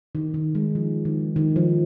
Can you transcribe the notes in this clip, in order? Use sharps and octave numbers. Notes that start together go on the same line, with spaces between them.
D#3
D#3
G#3
F3
D#3
D#3
F3